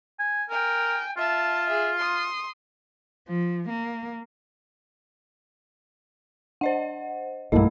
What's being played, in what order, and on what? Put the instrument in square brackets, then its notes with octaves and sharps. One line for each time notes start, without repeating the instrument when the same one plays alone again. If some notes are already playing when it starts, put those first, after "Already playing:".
[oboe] G#5
[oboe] A#4 [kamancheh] G5 G#5
[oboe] F4 [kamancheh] E5 A5
[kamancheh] G#4 E5
C6 D#6
[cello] F3
A#3
[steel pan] D4 [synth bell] C5 D#5 F#5
[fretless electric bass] B1 G2 [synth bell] A3 D#5 [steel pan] A#3 E4 A4